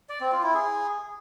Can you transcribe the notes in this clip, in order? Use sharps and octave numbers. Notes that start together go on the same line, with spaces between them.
D5
C4
F4
E4
G#4